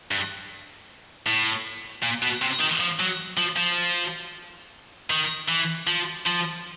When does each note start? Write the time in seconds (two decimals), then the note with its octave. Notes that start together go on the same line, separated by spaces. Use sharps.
0.11 G2
1.26 A2
2.03 A#2
2.22 B2
2.42 C3
2.60 D#3
2.80 F3
2.99 F#3
3.37 F3
3.57 F3
5.11 D#3
5.49 E3
5.87 F3
6.26 F3